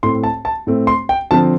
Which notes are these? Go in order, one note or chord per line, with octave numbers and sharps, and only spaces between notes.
A2 A3 C4 C6
A5
A5
A2 A3 C4
C6
G5
D3 F3 C4 A5